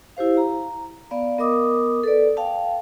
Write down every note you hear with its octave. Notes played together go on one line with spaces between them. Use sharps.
E4 G4 C5 F5
A#5
B3 D5 F5
B3 A#4 D#5 D6 D#6
A4 B4 D5
F5 G5 A5